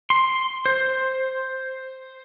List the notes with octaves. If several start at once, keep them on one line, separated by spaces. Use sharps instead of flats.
C6
C5